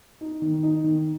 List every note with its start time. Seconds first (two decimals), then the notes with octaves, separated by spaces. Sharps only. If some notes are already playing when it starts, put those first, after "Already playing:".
0.21 D#4
0.42 D#3
0.63 D#4
0.84 D#3